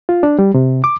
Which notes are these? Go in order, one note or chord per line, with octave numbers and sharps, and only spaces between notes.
F4
D4
G3
C3
D6